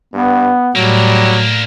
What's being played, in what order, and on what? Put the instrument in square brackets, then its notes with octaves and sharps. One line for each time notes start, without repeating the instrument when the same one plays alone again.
[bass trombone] G2 [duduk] B3
[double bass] A2 [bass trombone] F#3 [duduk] G3 [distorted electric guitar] A#3 D4